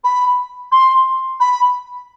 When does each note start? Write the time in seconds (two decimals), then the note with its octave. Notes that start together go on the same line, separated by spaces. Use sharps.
0.04 B5
0.72 C6
1.40 B5